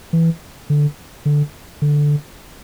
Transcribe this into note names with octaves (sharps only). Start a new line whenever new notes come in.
E3
D3
D3
D3